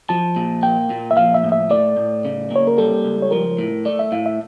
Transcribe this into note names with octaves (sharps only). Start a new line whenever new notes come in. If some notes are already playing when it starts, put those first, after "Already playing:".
F3 A5
A#2
A#3 G5
A#2
E5
F3 F5
E5
A2
E5
A3 D5
A2
C#3
A#3
C#5
A#4
G3 A4
C#2
C#5
F3 A#4
A2
A3 D5
E5
A2 F5
E5